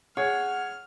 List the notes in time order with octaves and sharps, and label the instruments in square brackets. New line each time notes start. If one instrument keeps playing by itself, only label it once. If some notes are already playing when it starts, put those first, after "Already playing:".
[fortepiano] G#4 [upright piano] C#5 [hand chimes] F#5 [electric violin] F6